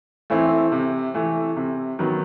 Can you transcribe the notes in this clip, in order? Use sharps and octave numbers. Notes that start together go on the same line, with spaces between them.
E3 A3 C4 E4
C3
E3 A3
C3
D#3 F#3 B3